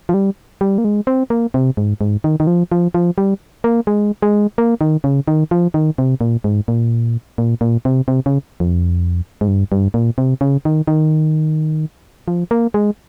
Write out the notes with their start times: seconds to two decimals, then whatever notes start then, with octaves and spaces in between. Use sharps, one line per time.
0.09 F3
0.14 G3
0.61 G3
0.78 A#3
0.85 G#3
1.07 C4
1.30 A#3
1.54 C3
1.77 G#2
2.01 G#2
2.24 D#3
2.40 D#3
2.47 F3
2.72 F3
2.94 F3
3.18 G3
3.64 A#3
3.87 G#3
4.22 G#3
4.58 A#3
4.81 D#3
5.04 C#3
5.28 D#3
5.51 F3
5.74 D#3
5.98 C3
6.21 A#2
6.44 G#2
6.68 A#2
7.38 A#2
7.61 A#2
7.85 C3
8.08 C3
8.26 C#3
8.60 F2
9.41 G#2
9.48 G2
9.72 G2
9.94 A#2
10.18 C3
10.41 C#3
10.65 D#3
10.87 D#3
12.28 F3
12.51 A#3
12.74 G#3